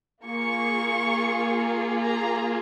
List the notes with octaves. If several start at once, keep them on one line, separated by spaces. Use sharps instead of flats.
A#3 F4 G#4 C#6
A#5